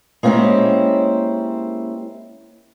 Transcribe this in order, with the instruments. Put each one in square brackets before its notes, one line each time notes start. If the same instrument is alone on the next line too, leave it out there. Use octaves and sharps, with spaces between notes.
[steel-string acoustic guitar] G#3 A#3 C4 C#4 E4 G4